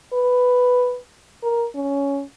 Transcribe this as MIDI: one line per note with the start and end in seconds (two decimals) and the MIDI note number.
0.13 0.98 71
1.43 1.66 70
1.75 2.23 61